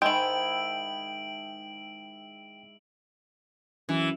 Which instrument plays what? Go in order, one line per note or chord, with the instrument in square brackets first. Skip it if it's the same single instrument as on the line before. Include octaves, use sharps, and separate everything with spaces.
[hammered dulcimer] G#2 E4 A5 [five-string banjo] D#3 G#3 [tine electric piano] G5 [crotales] D7 F#7
[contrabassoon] F#2 [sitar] E3